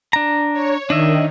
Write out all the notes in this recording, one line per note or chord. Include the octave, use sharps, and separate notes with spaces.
D4 A#5
C#5
D#3 D4 D#5 E5